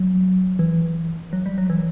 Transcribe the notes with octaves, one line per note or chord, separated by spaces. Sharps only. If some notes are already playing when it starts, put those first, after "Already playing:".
Already playing: F#3
E3
F#3
G3
F#3
E3